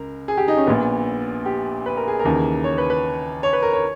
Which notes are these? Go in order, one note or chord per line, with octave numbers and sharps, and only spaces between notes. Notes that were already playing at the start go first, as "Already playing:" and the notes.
Already playing: C#2 A#4
G#4
G4
D#4
C#4
A#1 A#2 B3
G4
B4
A#4
G#4
A#4
D#2 C#3 E3
C#5
B4
B4
C#5
B4
A#4
C#5